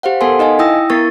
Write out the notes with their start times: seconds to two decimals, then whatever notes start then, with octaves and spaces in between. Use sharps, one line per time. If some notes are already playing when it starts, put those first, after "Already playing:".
0.03 G4 C5 F5 F#5
0.21 B3 A4 A#4 F#5 G#5 C6
0.39 D#4 D#5 F5 G#5
0.59 E4 G5 D#6 E6 A#6
0.90 B3 E4 A#4 C#6 A6